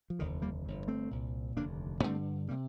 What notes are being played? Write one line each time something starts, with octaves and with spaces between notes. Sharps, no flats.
F3
F1 D#2 D3 D#3
G3 A#3
G1 F2 C3
A3 C4
C2 A#2
F1 D#2 D3 A#3 D4
A1 G2 D3 A3 C4
C3 G3 A#3